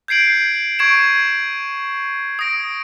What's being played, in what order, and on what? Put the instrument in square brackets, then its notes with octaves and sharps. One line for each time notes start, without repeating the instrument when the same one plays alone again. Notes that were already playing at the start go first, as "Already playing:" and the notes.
[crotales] G6 G#6 C7 D7 F#7
C#6 G#6 D7 E7
D#6 G#6 A#6 D7